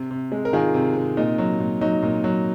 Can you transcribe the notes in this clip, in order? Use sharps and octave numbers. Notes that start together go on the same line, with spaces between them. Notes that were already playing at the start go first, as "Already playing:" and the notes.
Already playing: C3
C3
G#3
A#4
D#3 F4 G#4
C3
C3
A#2 D#4
F#3
A#2
F#3 D#4
A#2
F#3